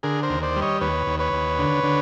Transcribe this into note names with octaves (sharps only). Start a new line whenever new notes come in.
D3 G#4 A#4
A#4 C5
D#2
C5 D5
G3
C#5 D#5
D#2 B4 C#5
D#2
B4 C#5
D#2
D3
D3